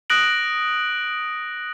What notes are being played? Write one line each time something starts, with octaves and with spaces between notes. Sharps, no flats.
D#6 F#6 A#6 D7 F#7